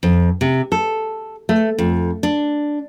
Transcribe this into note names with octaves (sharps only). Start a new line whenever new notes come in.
F2
C3
A4
A3
F2
D4